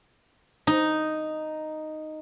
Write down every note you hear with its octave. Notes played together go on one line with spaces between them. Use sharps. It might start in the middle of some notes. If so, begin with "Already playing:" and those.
D#4